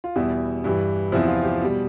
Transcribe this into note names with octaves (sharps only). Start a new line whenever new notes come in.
F4
E2 B2 G3 E4
G2 E3 G3
E2 C3 F3 E4
F4
G4
B2 G3